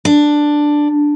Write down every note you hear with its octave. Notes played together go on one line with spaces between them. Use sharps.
D4